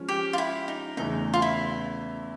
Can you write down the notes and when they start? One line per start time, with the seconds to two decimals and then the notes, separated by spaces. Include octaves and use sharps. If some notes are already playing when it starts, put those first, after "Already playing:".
Already playing: F3 G#3 C#4
0.09 G4
0.33 F4
0.38 E4
0.68 D#4
0.97 E2 C#3 E3 A3 D#4
1.34 F4
1.42 E4